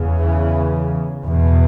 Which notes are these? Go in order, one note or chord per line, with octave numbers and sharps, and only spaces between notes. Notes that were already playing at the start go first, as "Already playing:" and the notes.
Already playing: E2 C#3
E3
E2 B2